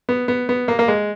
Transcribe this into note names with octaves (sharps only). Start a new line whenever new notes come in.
B3
B3
B3
A#3
A#3
G#3